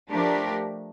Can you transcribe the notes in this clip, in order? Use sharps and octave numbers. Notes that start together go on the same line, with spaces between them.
F3 A3 D4 G4 A#4